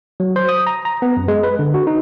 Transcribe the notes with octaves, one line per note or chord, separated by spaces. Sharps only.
F#3
C5
D#6
A#5
A#5
B3
F#2
G#3
B4
D3
F#4
D#4